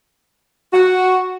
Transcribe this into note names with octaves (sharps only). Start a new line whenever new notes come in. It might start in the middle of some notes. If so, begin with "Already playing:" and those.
F#4